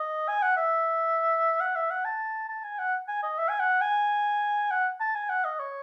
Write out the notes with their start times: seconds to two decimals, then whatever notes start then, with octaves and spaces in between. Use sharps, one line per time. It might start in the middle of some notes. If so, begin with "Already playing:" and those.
Already playing: D#5
0.28 G#5
0.42 F#5
0.57 E5
1.60 F#5
1.75 E5
1.90 F#5
2.05 A5
2.49 A5
2.64 G#5
2.79 F#5
3.08 G#5
3.23 D#5
3.38 E5
3.49 G#5
3.60 F#5
3.81 G#5
4.71 F#5
5.00 A5
5.15 G#5
5.29 F#5
5.44 D#5
5.59 C#5